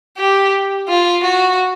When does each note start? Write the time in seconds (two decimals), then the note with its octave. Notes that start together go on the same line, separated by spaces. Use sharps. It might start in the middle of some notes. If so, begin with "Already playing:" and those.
0.18 G4
0.89 F4
1.24 F#4